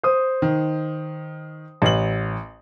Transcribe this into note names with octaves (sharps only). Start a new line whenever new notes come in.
C5 D#6
D#3
A1 F#7